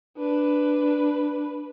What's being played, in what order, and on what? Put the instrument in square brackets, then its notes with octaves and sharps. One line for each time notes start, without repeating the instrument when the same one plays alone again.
[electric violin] D4 B4